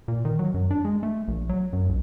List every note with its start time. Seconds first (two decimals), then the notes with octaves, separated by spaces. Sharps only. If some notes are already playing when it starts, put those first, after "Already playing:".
0.08 A#2
0.25 D#3
0.39 F#3
0.54 F#2
0.71 D4
0.85 G#3
1.03 A3
1.28 A#1
1.49 F#3
1.73 F#2
1.89 B1